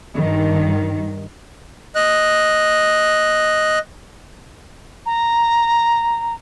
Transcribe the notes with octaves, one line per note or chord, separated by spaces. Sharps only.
G2 D#3
D#5 F#6
A#5